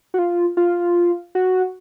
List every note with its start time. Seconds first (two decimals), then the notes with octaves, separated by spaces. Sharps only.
0.14 F#4
0.19 F4
0.57 F4
1.35 F#4